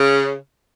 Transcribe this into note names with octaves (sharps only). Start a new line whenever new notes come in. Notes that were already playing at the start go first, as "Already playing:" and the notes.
Already playing: C#3